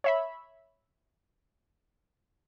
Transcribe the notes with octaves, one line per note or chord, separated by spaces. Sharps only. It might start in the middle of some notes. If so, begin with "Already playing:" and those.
C#5 E5 B5